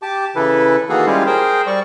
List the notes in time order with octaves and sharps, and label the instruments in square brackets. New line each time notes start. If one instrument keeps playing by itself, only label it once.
[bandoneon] G4 A5 D6
C#3 E3 E4 A4 B4
D#3 E3 A#3 F#4 G#4 A4
G3 G#3 C#4 E4 F4 G4
G#4 A#4 C5 G5
G3 D5 C#6